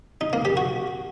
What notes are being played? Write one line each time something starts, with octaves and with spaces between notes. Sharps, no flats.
D#4
A#3
G4
F#4